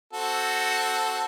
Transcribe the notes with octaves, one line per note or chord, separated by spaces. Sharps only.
C4 F#4 A4